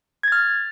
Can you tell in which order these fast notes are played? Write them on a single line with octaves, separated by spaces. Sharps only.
G#6 A6 F6